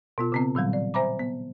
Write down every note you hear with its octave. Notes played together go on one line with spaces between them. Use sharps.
B2 B3 F4
C#3 B3 C4
A#2 D#3 F#3 G3
D5
C5 E5 G#5 A#5 B5 D6
B3